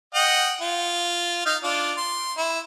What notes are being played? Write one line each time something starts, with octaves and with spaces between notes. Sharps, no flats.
D#5 F#5 G5
F4
D#4 F5
D4 F4
C6
E4